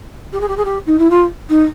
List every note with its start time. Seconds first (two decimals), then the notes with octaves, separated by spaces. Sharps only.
0.32 G4
0.40 G#4
0.48 G4
0.57 G#4
0.64 G4
0.86 D#4
0.98 E4
1.10 F4
1.49 D#4